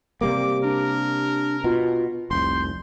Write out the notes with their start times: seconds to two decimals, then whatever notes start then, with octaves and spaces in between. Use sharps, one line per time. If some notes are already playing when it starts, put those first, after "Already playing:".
0.21 C3 G3 A#3 D6
0.64 D4 A#4
1.64 B2 F4
2.31 F1 C2 C6 G6